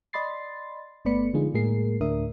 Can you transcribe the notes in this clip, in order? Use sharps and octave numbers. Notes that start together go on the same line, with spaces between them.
D5 D#5 B5 C6 A6 C7
G1 A3 B3 D5 B5 C#7
D3 F3 G#3 D#4 F4 G#4
A2 G#3 A#3 G#4 A#4 C7
D2 A2 D4 A#4 E5 D#6